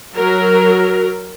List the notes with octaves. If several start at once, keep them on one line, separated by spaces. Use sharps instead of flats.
F#3 A#4